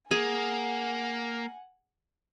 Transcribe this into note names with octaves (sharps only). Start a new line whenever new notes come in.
A#3 G#4 F#5 G#5